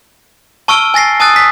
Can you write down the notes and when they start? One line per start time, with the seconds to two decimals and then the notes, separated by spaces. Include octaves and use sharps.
0.68 A5 C#6 E6 F6 D7 G7
0.94 G#5 A6 A#6 C7
1.20 G#5 A5 D#6 E6 F#6 A6
1.36 B6